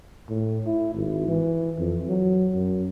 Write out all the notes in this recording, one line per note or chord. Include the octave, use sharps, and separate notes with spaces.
A2
E4
G#1
E3
F2
F#3
F#2